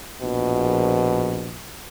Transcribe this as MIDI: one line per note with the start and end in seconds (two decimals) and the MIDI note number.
0.22 1.57 34
0.22 1.59 47